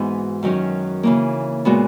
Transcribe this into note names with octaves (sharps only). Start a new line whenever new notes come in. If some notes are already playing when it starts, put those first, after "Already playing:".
Already playing: G#2 E3 B3 D#4 F#4
F#2 D#3 F#3 C#4
C#3 E3 A#3
A#2 G#3 B3 F#4